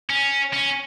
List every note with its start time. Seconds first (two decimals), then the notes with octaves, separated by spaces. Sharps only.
0.10 C#4
0.54 C#4